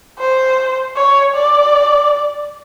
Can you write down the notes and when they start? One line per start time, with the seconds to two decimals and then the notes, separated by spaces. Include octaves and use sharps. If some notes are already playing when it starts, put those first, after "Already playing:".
0.19 C5
0.96 C#5
1.35 D5